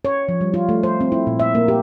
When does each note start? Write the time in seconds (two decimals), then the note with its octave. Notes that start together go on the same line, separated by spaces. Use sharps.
0.05 C#5
0.29 F3
0.41 G3
0.54 F4
0.69 A3
0.83 C5
1.01 C4
1.12 E4
1.27 A#2
1.40 E5
1.55 A#3
1.68 G4